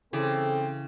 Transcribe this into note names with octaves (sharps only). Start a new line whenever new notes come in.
C#3 E3 C4 A4 D5